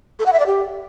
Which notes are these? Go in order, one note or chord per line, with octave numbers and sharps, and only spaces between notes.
A4
F#5
E5
D5
G4